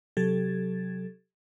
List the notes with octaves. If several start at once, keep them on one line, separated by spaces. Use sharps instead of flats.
C3 F#3 G4 A4 G#6 A6